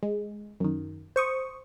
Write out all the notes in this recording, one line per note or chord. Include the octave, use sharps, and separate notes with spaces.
G#3
F#2 D#3
C5 C#6 D#6